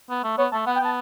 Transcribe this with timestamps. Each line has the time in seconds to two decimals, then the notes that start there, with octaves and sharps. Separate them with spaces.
0.10 B3
0.23 A3
0.38 B3 C#5
0.52 A3 A5
0.66 B3 F#5
0.76 G5
0.80 B3
0.85 A5